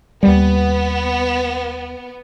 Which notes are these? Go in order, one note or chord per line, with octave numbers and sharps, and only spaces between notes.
D#2 G3 B3